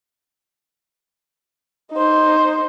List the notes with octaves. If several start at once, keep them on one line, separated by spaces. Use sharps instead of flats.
D#4 C5